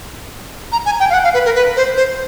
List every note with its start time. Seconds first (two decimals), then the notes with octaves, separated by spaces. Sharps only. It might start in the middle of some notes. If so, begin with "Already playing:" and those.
0.72 A#5
0.86 G#5
1.00 G5
1.10 F5
1.13 F#5
1.24 F5
1.34 B4
1.45 A#4
1.55 B4
1.76 C5
1.96 C5